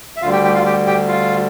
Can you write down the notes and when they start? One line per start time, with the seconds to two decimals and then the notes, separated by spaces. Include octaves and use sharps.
0.17 E5
0.22 D2 D3 G3 F4 F5
0.32 G4 G5
0.44 G4 G5
0.55 F4 F5
0.66 G4 G5
0.87 G4 G5
1.09 F4 F5